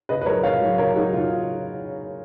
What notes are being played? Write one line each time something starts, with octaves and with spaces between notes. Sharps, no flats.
C#3 B4 D#5
B4
F#3 A#4 C#5
C#3 C#5 F5
F#3
C#3 A#4 C#5
F#3 D#4 F#4
C#3 F4